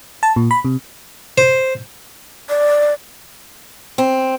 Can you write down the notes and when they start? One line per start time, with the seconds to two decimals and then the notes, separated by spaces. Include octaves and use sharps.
0.23 A5
0.36 A#2
0.51 B5
0.65 C3
1.38 C5
2.49 D5
3.98 C4